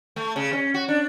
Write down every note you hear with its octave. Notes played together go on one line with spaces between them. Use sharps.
A3
C#3
C#4
F#4
D4